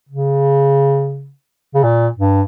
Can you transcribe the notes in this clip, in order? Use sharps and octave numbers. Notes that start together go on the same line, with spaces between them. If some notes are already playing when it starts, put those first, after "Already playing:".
C#3
C#3
A#2
G2